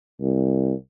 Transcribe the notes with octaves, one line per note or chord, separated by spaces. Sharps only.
C2